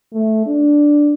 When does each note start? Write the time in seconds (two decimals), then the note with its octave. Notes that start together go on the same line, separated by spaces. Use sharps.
0.14 A3
0.47 D4